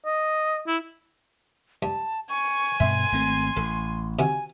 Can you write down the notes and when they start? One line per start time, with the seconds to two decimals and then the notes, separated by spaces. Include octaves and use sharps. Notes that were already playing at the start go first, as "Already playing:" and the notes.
0.05 D#5
0.67 E4
1.83 G2 A5
2.29 G#5 C#6
2.80 G2 B2 E5 C6
3.12 G#1 A3 C4
3.57 A1 A4
4.19 C3 D#3 F#4 G#5